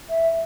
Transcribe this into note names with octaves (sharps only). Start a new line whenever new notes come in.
E5